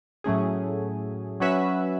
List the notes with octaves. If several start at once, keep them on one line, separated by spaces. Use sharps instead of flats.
A2 F#3 A3 C#4 G#4
F#3 C#4 F#4 B4 E5